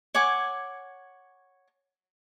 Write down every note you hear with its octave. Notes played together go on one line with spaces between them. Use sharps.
C#5 F#5 G#5 D6